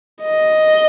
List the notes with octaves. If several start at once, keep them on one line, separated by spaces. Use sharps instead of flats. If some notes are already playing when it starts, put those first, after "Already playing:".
D#5